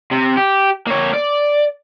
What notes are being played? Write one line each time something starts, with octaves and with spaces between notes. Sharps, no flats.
C3
G4
A#3 C#5
D5